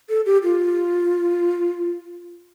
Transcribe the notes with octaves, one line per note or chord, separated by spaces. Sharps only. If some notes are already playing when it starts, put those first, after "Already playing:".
A4
G4
F4